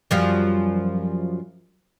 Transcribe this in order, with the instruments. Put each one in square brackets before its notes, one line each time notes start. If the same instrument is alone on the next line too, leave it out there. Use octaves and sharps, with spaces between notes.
[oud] F#2 F3 G3